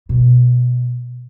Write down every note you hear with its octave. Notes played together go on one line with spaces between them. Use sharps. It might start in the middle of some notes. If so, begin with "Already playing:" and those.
B2